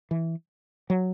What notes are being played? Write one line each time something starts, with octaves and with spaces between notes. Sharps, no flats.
E3
F#3